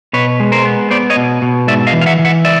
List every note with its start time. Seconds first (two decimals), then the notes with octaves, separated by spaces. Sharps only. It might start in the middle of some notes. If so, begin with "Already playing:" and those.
0.13 B2 B4 C#5
0.40 G#3
0.52 A#4 C5
0.65 B3
0.91 B3 C5 D5
1.10 C#5 D#5
1.16 B2
1.42 B2
1.67 G#2 D5 E5
1.87 D#5 F5
1.93 E3
2.01 F5
2.06 E5 F#5
2.19 E3
2.25 E5 F#5
2.45 D5 E5